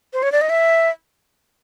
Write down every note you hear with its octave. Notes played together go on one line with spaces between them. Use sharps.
C5
C#5
D5
D#5
E5